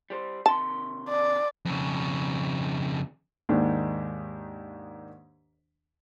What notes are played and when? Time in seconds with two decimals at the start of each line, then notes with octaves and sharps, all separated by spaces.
0.10 G3 G4 C5
0.46 C3 D#3 A5 C6
1.09 D5
1.65 F2 C#3
3.49 D#2 G#2 D#3 D4